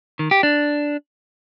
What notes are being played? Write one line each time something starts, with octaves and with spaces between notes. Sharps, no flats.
D#3
G4
D4